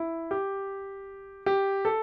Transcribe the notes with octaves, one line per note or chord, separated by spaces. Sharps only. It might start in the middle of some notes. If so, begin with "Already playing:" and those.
Already playing: E4
G4
G4
A4